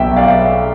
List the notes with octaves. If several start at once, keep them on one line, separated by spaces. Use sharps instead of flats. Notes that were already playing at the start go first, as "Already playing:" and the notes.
Already playing: B1 B2 B3 E5 G5
D5 F5